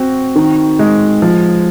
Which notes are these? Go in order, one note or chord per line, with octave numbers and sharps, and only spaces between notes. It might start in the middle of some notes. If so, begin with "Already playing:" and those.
Already playing: C4 F#4
D#3
G#3
F3